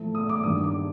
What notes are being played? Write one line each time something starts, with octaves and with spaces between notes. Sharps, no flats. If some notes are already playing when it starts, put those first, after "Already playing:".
Already playing: A2 F3 A3
D#6
D6
G2 D#3 G3 D#6
D6